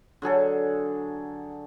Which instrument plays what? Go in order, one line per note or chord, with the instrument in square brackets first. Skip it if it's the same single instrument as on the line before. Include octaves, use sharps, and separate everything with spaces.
[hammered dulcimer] D3 F#3 G#4 A4